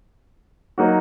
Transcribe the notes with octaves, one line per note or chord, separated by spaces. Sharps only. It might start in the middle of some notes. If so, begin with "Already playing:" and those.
F#3 A#3 D#4 F#4